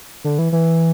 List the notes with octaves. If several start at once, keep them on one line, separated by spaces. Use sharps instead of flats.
D3
E3
E3